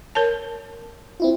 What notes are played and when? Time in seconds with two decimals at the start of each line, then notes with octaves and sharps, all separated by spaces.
0.15 A#4 C#5 A5
1.20 C4 E4 F4